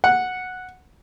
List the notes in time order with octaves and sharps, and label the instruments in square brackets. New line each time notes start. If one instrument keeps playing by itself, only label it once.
[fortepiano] F#5